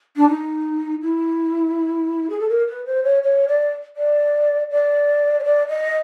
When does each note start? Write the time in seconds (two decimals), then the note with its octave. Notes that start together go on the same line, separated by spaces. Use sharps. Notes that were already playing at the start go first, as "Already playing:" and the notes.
0.16 D4
0.29 D#4
1.02 E4
2.30 G#4
2.40 A4
2.49 A#4
2.67 B4
2.86 C5
3.04 C#5
3.23 C#5
3.48 D5
3.96 D5
4.70 D5
5.40 C#5
5.44 D5
5.68 D#5